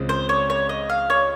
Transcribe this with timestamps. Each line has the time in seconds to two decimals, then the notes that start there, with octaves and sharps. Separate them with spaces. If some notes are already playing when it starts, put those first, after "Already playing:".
Already playing: C#2 C#3 G#3 C4
0.09 C5
0.29 C#5
0.50 C#5
0.69 D#5
0.90 F5
1.10 C#5